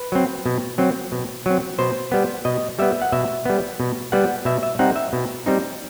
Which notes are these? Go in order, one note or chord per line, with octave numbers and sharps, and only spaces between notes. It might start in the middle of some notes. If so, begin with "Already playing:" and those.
Already playing: B4
F#3 C4
B2
F#3 C4
B2
F#3 C4
B2 C5
G3 B3
B2 D#5
G3 B3 E5
F#5
B2 E5
G3 B3
B2
G3 B3 F#5
B2 E5
E5
G3 C4 D#4 F#5
E5
B2
G3 C4 D#4